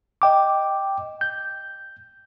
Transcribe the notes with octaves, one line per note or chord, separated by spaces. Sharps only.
D#5 G5 D6
G6